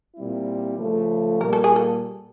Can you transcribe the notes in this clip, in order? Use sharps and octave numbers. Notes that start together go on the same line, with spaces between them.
A#2 G3 C4 E4
C#3 F3 A3
A#2 G3 A#3 A#4
A4
G#4
A4